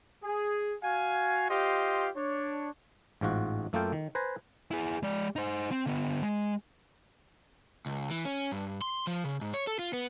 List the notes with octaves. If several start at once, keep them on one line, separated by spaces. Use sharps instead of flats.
G#4
F#4 F5 G#5
F4 G4 C5 D#5 F5 C6
D4 C#5
A1 G#2 F4 F#4
F#2 A3 A#3 F4 A4 G5
D#3
B4 C5 G#5 A#5
E4 G#4
G#3 D5
D#4 C5
C4
D3 B3
G#3
C#2
E3
C#4
G2
C6
F3
C#3
G#2
C#5
A4
F4
B3